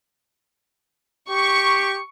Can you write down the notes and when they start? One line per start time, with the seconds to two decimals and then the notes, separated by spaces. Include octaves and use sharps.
1.29 G4 C#6